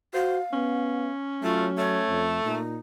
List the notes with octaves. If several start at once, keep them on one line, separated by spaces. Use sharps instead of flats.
F#4 C5 F5
B3 C#4
F#3 A3 F4
A3 C#5
F2
A#2 D#4